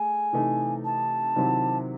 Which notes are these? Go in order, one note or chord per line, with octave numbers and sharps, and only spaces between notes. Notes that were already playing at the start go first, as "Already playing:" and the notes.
Already playing: A3 G#4 G#5
C3 E3 A3 D#4
A5
C3 D#3 F#3 C4 E4